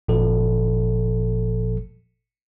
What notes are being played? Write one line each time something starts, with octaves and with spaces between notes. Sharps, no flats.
G1 A#2 F3 A4